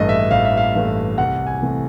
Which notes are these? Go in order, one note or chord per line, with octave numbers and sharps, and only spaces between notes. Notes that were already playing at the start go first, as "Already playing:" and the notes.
Already playing: A1 G2 E3 A3 D#5
E5
A1 F5
E5
F5
G2 E3 A3
C2 F#5
G#5
C3 E3 A3